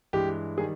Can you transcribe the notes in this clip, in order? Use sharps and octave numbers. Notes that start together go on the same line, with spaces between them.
G2 E3 G#3 G4
D#3 G3 G#4